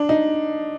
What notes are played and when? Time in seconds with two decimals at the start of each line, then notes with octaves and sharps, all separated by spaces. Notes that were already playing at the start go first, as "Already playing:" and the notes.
Already playing: D4
0.09 D#4